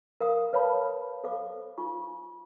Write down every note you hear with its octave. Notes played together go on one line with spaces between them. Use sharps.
A#4 F5 D#6
B4 C#5 F5 A5 B5
A4 C5 F5 D6
D#4 F4 C#6